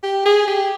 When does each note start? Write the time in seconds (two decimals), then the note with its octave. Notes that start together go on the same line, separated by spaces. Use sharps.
0.03 G4
0.26 G#4
0.47 G4